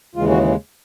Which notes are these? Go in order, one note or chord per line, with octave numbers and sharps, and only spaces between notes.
D#2 C#3 E3 G#3 F4
F#4